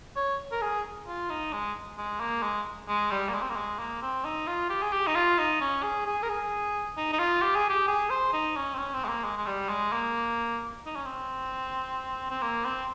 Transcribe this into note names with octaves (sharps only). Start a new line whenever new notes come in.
C#5
A#4
G#4
F4
D#4
G#3
G#3
A#3
G#3
G#3
G3
A#3
G#3
C4
A#3
G#3
A#3
C4
D#4
F4
G4
G#4
G4
D#4
F4
D#4
C#4
G#4
G#4
A#4
G#4
D#4
D#4
F4
G4
G#4
G4
G#4
C5
D#4
C#4
C4
C#4
C4
G#3
A#3
G#3
G#3
G3
G#3
A#3
D#4
C#4
C4
C4
A#3
C4